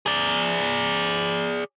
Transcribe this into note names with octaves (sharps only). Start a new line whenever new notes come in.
G#4 D5